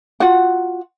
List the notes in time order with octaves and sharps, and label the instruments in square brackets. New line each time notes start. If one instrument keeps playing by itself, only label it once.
[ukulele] F4 F#4 F#5